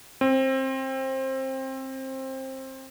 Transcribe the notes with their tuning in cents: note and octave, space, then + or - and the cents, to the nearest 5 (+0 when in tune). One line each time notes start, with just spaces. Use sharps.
C4 +20